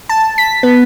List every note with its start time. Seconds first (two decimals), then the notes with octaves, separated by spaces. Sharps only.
0.09 A5
0.38 B6
0.63 B3